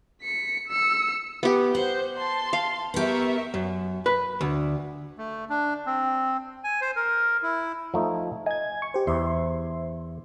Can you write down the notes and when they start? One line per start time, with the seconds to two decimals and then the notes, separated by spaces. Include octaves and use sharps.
0.22 B6 C#7
0.68 E6 C#7
1.43 B3 G4
1.75 C5 F#5 G6
2.16 A5 C6
2.53 F5
2.94 B3 G4 A#4 E5 C#6
3.54 F#2
4.06 B4
4.41 D2
5.18 A3
5.50 D4
5.86 C4
6.64 G#5
6.81 C5
6.96 A#4
7.43 E4
7.94 F3 A3 D#4
8.46 D#5 G#5 G#6
8.82 C#6
8.94 G4 C5
9.07 E2 C5 E5 C6